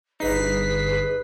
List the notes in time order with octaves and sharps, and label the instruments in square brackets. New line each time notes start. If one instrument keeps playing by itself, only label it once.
[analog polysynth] G1 B6 C7 [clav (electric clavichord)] D#4 [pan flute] G#4 [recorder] B4